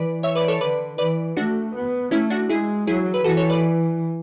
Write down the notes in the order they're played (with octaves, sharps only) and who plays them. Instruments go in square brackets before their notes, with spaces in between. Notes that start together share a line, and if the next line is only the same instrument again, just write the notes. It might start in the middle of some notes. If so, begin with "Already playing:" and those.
Already playing: [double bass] E3 [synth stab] B4 D5
[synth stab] C#5 E5
B4 D5
A4 C#5
[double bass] D3 [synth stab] B4 D5
[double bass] E3 [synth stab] B4 D5
[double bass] A3 [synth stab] D4 F#4
[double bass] B3
[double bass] A3 [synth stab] C#4 E4
[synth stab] D4 F#4
[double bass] G#3 [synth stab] E4 G#4
[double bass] F#3 [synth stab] E4 G#4
[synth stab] B4
[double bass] E3 [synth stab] F#4 A4
[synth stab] A4 C#5
B4 D5